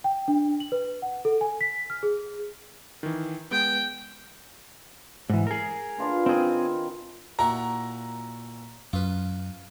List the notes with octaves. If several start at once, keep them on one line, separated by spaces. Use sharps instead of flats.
G5
D4
F#7
B4
F#5
A4
G#5
B6
F6
G#4
D#3 E3
G#3 B3 G5
G#2 E3
G#4 A#4
D4 F4 B4
D#3 C4 G#4
A#2 E4 F#4 A#5
F#2 F4 B4